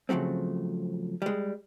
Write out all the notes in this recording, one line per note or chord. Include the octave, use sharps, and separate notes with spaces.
C#3 F3 F#3 A3 C4
G3 G#3